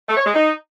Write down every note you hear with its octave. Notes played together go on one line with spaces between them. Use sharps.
A3
C#5
G#3
D#4